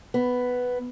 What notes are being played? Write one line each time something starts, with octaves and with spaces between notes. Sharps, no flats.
B3